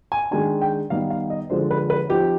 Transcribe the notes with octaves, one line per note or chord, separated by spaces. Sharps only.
G#5
D#3 G#3 D4 G#5
G5
D#3 G3 B3 D#4 F5
F5
D#5
D3 F3 G#3 D4 C5
B4
B4
F3 C4 D#4 G4